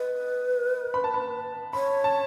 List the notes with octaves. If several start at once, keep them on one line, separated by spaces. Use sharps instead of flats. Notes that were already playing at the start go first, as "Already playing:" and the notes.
Already playing: B4 D#5
B5
A5
B5
C#5 B5
A5